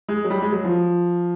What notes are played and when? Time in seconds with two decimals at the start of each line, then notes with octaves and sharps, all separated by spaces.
0.08 G#3
0.24 F#3
0.30 G3
0.42 G#3
0.53 F#3
0.64 F3